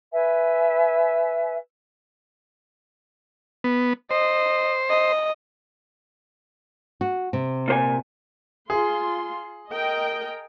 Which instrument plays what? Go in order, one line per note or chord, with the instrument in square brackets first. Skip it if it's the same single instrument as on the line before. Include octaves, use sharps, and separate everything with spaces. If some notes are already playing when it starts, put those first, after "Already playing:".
[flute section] B4 E5 G#5
[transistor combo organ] B3
[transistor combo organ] C5 [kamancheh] D#5
[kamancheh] D#5
[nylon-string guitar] F#4
C3
[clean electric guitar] A#2 C5 G#5
[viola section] F4 C6 [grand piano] G#4
[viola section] A#4 D#5 G5